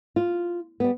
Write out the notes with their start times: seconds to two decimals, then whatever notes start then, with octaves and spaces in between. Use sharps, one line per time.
0.16 F4
0.80 G3 B3